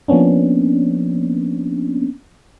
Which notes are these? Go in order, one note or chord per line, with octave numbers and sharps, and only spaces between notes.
F3 A#3 B3 C#4 D4